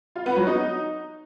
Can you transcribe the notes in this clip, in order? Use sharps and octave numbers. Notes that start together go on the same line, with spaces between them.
F4
B3
F#3
D#4